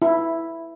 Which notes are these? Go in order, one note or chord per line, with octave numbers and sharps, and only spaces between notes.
E4